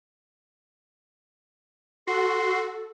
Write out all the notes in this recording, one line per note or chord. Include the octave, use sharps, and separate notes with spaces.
F#4 A4 C6